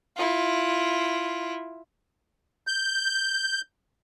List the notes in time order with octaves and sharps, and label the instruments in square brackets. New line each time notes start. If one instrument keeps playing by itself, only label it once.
[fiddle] E4 F4
[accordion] G6